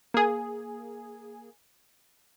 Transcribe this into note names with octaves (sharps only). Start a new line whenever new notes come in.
A#3 G#4